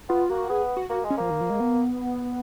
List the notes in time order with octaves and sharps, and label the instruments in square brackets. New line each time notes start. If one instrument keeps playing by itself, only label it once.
[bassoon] B3 [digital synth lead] F4
[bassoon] A#3 [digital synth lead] F#4
[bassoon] B3 [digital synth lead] G#4
[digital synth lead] F#4
[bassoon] A#3 [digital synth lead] F#4
[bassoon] G#3
[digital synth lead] C#4
[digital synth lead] F3 [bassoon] A#3
[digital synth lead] D#3
F3
G#3
B3